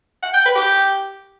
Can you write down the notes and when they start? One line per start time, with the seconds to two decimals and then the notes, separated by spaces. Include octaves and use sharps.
0.23 F#5
0.34 G5
0.45 B4
0.55 G4